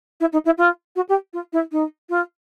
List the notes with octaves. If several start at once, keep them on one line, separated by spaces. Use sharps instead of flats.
E4
D#4
E4
F4
F#4
G4
F4
E4
D#4
F4